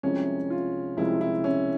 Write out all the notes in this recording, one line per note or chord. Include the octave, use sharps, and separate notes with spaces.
C2 C3 F3 G#3 C#4
F4
C2 C3 F3 G#3 E4
E4
C#4